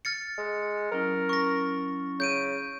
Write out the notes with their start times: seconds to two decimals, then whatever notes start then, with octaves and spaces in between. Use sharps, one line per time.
0.05 F6 A6 C#7
0.38 G#3
0.92 F#3 C#4 E4 A#4
1.29 C#6 A#6
2.20 C#3 G6 D7 D#7